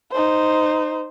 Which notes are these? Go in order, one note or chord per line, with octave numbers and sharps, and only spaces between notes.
D#4 C5